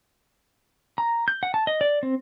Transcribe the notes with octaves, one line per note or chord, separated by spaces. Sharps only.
A#5
G6
F#5
A5
D#5
D5
C4